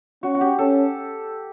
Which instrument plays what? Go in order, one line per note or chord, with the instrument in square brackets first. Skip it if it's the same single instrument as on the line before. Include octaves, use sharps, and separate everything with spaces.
[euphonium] C#4 [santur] F#4
[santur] F#4
G4
[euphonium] C#4 [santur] A4